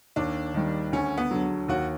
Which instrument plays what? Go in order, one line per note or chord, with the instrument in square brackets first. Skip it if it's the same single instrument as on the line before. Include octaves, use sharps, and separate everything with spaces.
[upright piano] D#2 [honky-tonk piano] D4
[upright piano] D#3 G3
[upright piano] D2 [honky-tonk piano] C#4
[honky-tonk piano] B3
[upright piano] D3 F#3
[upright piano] D#2 [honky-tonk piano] F#4